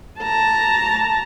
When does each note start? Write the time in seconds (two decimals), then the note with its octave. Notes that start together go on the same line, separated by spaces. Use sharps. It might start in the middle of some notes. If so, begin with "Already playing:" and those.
0.20 A5 A#5